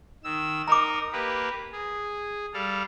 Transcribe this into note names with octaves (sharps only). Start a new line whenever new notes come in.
D#3 E6
D#4 A#4 A#5 D6
A#3 G4 B4
G#4
G3 A4 F5